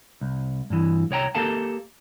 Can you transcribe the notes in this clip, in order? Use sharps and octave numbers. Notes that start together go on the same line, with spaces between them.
C2
G2 E3
C2 C#5 G5 A#5
A#3 G4 A4 A#4 F5 A5